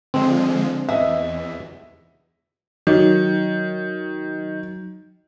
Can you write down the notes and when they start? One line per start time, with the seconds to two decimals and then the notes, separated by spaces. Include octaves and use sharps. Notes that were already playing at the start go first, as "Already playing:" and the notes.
0.14 D3 F3 G#3 C4
0.89 E2 D#5 E5
2.87 D#3 F#3